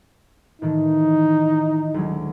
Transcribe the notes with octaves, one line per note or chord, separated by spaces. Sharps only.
A2 D#3 E3 D#4
D2 F#3 G#3